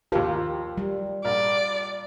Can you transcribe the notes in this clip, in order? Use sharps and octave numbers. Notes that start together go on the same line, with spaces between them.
D#2 F3 F4 G4 A#4
G3
A#1 A#4 D5